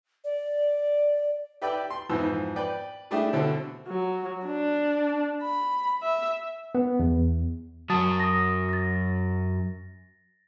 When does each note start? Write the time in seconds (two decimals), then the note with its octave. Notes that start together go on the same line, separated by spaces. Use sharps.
0.24 D5
1.62 G4 B4 D5 E5 G5
1.90 C6
2.10 F2 G#2 E3 F3 B3 E6
2.56 B4 D5 G5
3.11 G3 A3 D4 E4 G4 G#4
3.33 B2 D3 C4 E4 A4
3.88 F#3
4.47 D4
5.43 B5
6.02 E5
6.75 B3
6.99 E2
7.90 F#2 F#3 A5 D#6 A6
8.20 D#6 A#6
8.69 A6 A#6